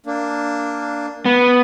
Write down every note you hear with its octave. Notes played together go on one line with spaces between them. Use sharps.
A#3 D4
B3